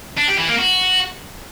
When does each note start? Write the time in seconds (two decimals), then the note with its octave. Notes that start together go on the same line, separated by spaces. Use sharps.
0.18 D4
0.28 G4
0.38 E3
0.49 A#3
0.59 F#4